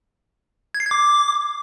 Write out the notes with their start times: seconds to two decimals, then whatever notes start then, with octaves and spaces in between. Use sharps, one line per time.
0.74 G#6
0.80 C7
0.86 G#6
0.91 D6